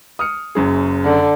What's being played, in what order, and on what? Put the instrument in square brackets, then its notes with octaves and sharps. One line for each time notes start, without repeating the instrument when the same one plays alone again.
[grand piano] D#6 F6 C#7
F#1 F#2 G#4
[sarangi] D3